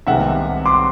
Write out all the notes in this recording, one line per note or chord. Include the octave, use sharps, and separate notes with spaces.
C2 C3 D#3 G#3 B3 E5 F#5
C6 D6